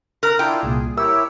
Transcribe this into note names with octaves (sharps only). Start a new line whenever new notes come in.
A#4 A#5 F#6
D4 E4 F4 G5
C2 A#2 G#4
E4 G4 A#4 C#5 E6